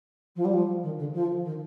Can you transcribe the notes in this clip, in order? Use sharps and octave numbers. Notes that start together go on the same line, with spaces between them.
F3
G3
F3
D#3
D3
F3
D#3